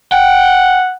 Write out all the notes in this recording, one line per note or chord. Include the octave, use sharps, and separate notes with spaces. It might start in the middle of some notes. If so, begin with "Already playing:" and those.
F#5 G5